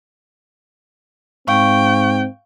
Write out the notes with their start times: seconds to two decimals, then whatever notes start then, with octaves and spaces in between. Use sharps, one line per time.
1.48 G#2 C4 F5 G5 C#6